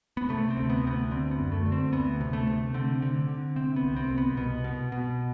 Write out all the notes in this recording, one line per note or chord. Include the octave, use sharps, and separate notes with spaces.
B3
C3 A3
C4
D2
B3
D2 C4
B3
D3 C4
B3
F#2
A3
D3
C4
D2 B3
C3
A3
C3
D3 C4
D3
D3
C3 C4
B3
C2
C4
C2
B3
B2 B3
B2
B2